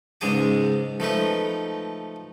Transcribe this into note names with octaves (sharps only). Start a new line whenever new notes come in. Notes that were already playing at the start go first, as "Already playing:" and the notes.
C#2 G#2 G#3 G#4 G#5 D6
F3 A3 D#4 B4